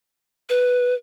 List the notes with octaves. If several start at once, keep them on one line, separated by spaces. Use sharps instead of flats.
B4